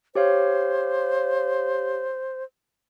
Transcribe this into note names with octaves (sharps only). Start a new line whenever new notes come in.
G4 C5 C#5 F5